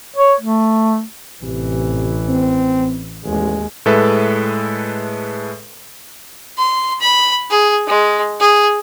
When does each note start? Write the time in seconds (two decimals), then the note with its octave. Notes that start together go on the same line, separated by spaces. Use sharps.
0.16 C#5
0.40 A3
1.43 A1 C3 E3
2.28 C4
3.25 A1 D#2 G#3
3.86 A2 G#3 A4 B4 E5
6.58 C6
7.00 B5
7.50 G#4
7.87 G#3
8.40 G#4